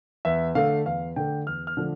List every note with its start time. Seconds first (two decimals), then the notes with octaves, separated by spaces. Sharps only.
0.25 E2 E5
0.55 D3 A3 F5
0.86 E2 F5
1.16 D3 A3 G5
1.47 E2 F6
1.67 F6
1.77 D3 F3 A3